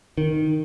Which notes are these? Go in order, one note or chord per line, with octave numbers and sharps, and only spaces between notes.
D#3